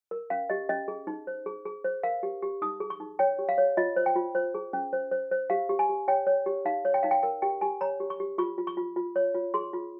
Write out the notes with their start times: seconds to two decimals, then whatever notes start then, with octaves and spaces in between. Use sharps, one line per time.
0.11 A#4
0.30 C#4 F5
0.50 G4 D#5
0.69 C#4 D#5
0.88 G#4
1.07 D#4
1.27 C5
1.46 G#4
1.66 G#4
1.84 C5
2.03 A#4 F5
2.23 G4
2.42 G4
2.62 D#4 D#6
2.80 G#4
2.90 C#6
3.00 D#4
3.19 C#5 G5
3.39 G4
3.49 F5
3.58 C#5
3.77 F4 D#5
3.96 C5
4.06 G5
4.16 F4
4.35 C5
4.55 G#4
4.73 C#4
4.93 C5
5.11 C5
5.31 C5
5.50 G4 F5
5.69 G4
5.79 G#5
5.89 G4
6.08 C#5 G5
6.27 C#5
6.46 G4
6.65 D#4 F5
6.85 C#5
6.94 G5
7.03 D#4 F5
7.11 G5
7.23 A#4 G5
7.42 G4 G5
7.61 G4 G#5
7.81 C#5 A#5
8.00 G4
8.10 C#6
8.20 G4
8.38 F4 C#6
8.58 F4
8.67 C#6
8.77 F4
8.96 F4
9.16 C#5
9.34 F4
9.54 G#4 C6
9.73 F4